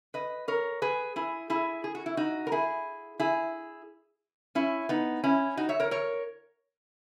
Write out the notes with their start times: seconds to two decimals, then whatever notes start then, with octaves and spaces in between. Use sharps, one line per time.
0.14 B4 D#5
0.48 A#4 C#5
0.82 G#4 B4
1.16 E4 G#4
1.50 E4 G#4
1.84 G#4
1.95 F#4
2.06 E4
2.17 D#4 F#4
2.47 A#4
2.52 E4 G#4
3.20 E4 G#4
4.55 C#4 E4
4.89 B3 D#4
5.24 C#4 E4
5.57 D#4 F#4
5.69 C#5 E5
5.80 A#4 C#5
5.91 A#4 C#5